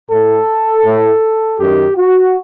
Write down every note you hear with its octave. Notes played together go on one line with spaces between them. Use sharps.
A2 A4
A2
F#2 D#3 G4
F#4